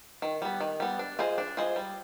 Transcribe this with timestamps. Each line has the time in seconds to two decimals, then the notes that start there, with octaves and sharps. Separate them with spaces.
0.22 D#3
0.42 G3 B3
0.61 D#3
0.80 G3 B3
0.99 D4
1.19 F4 G#4 C5 D#5
1.38 D4
1.57 F4 G#4 C5 D#5
1.76 G3